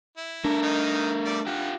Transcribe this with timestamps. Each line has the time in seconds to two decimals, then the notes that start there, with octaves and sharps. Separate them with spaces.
0.17 E4
0.45 A3 D4 A#4
0.63 D#3 D#4
1.25 G3 D5
1.46 F4 G4 F#5